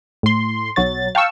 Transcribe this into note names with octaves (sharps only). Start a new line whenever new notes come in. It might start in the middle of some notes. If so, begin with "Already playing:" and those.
A2 C6
B1 F#3 C#5 A6
F5 G5 A5 C#6 E6